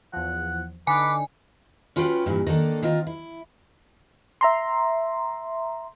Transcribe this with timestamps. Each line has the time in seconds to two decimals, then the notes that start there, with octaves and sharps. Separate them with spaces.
0.13 E2 F3 F#5
0.87 D3 D4 D#4 B4 G#5 D6
1.96 C#4 F4 F#4 B4 G5
2.26 G2 A#2 E3
2.47 D#3 A#3 D4 A4
2.82 D#3 C4 F4 A#4
3.07 E4
4.41 E5 A#5 C6